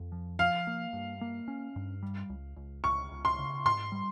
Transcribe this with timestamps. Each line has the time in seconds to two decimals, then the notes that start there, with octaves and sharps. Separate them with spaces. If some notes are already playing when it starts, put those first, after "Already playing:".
Already playing: F2
0.12 F3
0.39 F3 F5
0.67 A#3
0.93 G2
1.21 A#3
1.48 C#4
1.76 G2
2.03 G3
2.30 C#2
2.56 C#2
2.84 C#2 C#6
3.11 C#2
3.25 C6
3.38 C#3
3.65 G#2 C6
3.92 G3